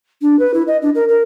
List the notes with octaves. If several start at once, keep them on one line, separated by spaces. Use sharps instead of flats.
D4
B4
E4
D#5
D4
A#4
A#4